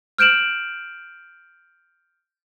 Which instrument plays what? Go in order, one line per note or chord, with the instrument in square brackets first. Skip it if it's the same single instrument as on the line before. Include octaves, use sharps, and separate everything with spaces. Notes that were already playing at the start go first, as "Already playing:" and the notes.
[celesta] F6 G6 D7 E7 F#7